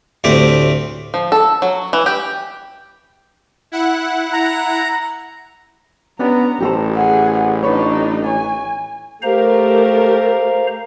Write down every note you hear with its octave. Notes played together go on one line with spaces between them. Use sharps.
D2 A2 C4 G4
F3
A4
F#3
E3
G4
E4 F#5
A#5
B3 C#4 D4 G4 A#5
A1 G4 A4 C5
G#4 F#5
D4 D#4 B4 C#5
C#5 G#5
A3 G4 A#4 C5 F5 A#5